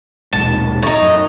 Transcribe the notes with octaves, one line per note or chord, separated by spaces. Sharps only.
D#1 B1 G#2 A5
A2 D#4
F#2